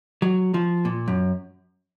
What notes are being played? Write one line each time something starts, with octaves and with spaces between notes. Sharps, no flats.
F#3
F3
A#2
F#2